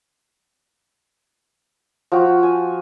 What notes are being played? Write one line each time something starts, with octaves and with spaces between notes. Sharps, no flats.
F3 F#4 G5
G#5